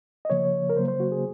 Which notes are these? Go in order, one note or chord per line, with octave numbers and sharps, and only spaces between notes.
D#5
C#3 F3 A#3 C#5
A#4
C#3 F#3 A#3 C5
C5
F#4
G#4